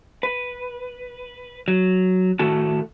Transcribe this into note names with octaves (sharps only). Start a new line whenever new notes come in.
B4
F#3
A2 D#3 A3 F#4 A4 A5